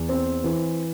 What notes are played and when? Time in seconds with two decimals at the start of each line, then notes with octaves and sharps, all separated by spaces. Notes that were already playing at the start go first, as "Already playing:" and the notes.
Already playing: E2
0.09 C4
0.44 E3